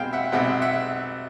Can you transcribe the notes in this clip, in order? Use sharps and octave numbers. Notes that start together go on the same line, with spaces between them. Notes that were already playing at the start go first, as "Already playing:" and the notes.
Already playing: B1 B2 G#3 C4 F5 G5
E5 F#5
B1 B2 G#3 C4 E5 F#5
E5 F#5